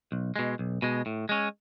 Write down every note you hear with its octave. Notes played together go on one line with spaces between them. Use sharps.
B1
B2 G#3
B1
B2 G#3
A2
G#3 C#4